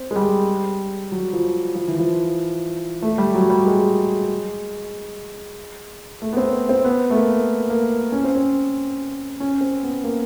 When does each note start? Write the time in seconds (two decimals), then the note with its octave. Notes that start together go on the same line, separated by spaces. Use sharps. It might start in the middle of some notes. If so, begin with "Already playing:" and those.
Already playing: C4
0.11 G#3
0.16 G3
1.12 F#3
1.33 F3
1.75 F3
1.88 E3
1.99 F3
3.02 A3
3.18 G3
3.34 F#3
3.50 G3
3.66 G#3
6.22 A3
6.33 B3
6.37 C4
6.69 C4
6.85 B3
7.10 A3
7.16 A#3
7.70 A#3
8.12 C#4
8.24 C4
8.35 C#4
9.40 C#4
9.61 C4
9.83 B3
10.04 A#3